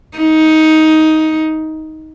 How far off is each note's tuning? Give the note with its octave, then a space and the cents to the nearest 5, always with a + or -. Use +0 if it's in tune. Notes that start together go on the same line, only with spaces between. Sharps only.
D#4 +15